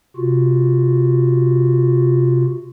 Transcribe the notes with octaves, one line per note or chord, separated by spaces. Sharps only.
C3 F4 F#4